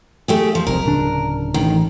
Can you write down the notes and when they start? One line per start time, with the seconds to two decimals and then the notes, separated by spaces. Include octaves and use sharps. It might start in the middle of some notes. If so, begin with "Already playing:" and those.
0.28 A3 G4 G#4
0.55 F3
0.67 F1 C2 F2 A#4
0.86 D1 C#3 D4
1.54 A1 D#3